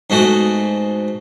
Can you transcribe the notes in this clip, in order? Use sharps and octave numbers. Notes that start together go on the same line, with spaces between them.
G#2 B2 G#3 A3 F#4